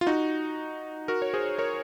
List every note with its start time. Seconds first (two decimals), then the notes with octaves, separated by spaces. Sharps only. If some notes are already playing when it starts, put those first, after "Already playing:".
0.01 F4
0.06 D#4 F#4
1.08 F#4 A#4
1.22 C#5
1.34 G#4 C5
1.58 A#4 C#5